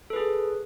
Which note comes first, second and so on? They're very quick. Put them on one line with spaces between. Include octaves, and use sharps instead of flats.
A4 B4 G#4